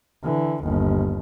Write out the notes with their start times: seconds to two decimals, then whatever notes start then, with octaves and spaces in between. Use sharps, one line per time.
0.23 D3 E3
0.63 G1 D#2